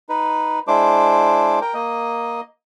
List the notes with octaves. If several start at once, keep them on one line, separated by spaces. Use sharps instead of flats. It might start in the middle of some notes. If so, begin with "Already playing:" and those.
D#4 B4
G#3 D4 E4 C5 D6
A#4 G5
A#3 D#5